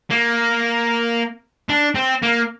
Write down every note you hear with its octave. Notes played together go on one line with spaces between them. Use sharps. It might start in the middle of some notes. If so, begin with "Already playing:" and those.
A#3
D4
C4
A#3